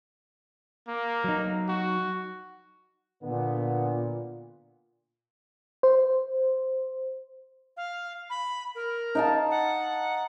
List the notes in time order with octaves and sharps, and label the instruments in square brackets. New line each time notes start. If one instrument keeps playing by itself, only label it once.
[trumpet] A#3
[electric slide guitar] F#3 D#4
[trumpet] F#4
[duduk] A#2 [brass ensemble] D3 B3
[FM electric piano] C5
[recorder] F5
B5
A#4
[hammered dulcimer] D#4 F5 A5
[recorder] F#5